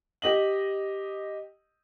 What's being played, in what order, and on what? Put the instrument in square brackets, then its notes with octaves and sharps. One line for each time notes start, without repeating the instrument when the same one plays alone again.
[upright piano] G4 D#5 F#7